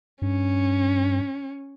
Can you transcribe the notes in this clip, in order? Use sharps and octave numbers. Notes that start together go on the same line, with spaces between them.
G2 C#4